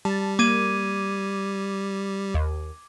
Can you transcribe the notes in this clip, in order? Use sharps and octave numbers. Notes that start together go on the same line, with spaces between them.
G3 A5
A#3 D6 G#6 D#7
D#2